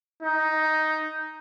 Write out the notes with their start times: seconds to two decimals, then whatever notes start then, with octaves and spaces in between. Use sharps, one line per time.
0.22 D#4